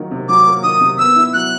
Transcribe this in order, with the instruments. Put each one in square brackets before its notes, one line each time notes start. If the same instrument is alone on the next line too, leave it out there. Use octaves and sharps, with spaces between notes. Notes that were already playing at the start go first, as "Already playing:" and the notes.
Already playing: [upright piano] D#3 F#3 A#3
C3
[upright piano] F#3 [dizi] D6
[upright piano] A#3
[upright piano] D#3 [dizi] D#6
[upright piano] C3
[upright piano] B3 [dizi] E6
[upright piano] E4
[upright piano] F#3 [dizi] F#6